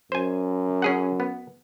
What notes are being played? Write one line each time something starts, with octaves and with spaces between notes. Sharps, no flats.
F#2 C5 G#5
C#4 G#4 F#5
B3